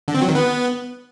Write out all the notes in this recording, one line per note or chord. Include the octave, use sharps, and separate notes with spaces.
D3
C4
F#3
D#3
B3